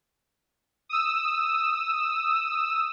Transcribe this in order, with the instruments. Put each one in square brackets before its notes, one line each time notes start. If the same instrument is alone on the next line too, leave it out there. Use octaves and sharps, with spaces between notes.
[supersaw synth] D#6 E6